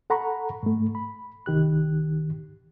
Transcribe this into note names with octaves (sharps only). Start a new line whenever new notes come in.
A4 F#5 A#5 B5 C#6
G#2 A3
B5
C2 D#3 G4 F#6